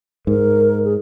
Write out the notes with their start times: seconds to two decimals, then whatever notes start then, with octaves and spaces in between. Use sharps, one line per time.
0.27 G#2 A#4
0.85 G#4